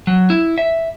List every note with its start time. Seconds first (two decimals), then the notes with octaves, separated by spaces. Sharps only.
0.07 F#3
0.30 E4
0.58 E5